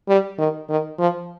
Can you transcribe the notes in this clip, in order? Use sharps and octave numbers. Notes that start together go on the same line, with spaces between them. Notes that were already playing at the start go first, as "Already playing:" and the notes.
G3
D#3
D#3
F3